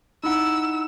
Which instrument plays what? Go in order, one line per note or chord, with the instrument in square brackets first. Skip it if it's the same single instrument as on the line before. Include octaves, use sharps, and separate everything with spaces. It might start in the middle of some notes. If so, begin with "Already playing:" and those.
[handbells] D#4 E4 F#5 [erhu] E6